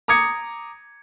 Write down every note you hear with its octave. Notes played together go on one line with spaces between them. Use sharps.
A#5 D6 D#6 G#6 C#7